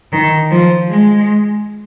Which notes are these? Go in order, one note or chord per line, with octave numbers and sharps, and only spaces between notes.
D#3
F3
G#3